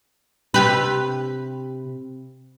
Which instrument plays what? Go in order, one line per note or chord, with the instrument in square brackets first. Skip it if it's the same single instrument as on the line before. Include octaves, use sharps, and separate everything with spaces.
[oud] C3 G4 B4